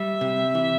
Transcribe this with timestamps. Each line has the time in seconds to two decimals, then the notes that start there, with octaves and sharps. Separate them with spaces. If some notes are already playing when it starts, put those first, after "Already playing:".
Already playing: G3 E5
0.21 C3
0.55 E3